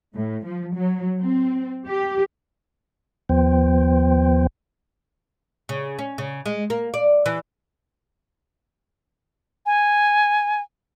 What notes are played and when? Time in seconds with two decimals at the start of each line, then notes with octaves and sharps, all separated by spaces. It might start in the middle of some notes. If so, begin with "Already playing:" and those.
0.14 A2
0.45 F3
0.75 F#3
1.20 C4
1.87 G4
3.29 D#2 F3 B3 C5 G5
5.69 C#3
5.99 C#4
6.18 C#3
6.46 G#3
6.70 A#3
6.94 D5
7.26 E3
9.66 G#5